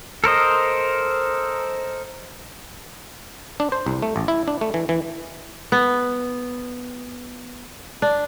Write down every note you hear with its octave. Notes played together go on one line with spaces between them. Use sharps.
A4 A#4 C5 D#5
D4
C5
C2
A3
A1
E4
D4
A3
E3
E3
B3
D4